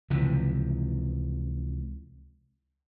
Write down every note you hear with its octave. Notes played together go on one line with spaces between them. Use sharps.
C#2 C3 E3 F3